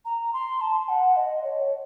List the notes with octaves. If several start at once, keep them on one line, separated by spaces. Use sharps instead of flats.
A#5
C6
A5
F#5
D#5
C#5